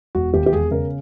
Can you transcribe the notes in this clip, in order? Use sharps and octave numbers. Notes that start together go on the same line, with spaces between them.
E1 F#4
D#2 G4
G4
E1 G#4
C#3 A#4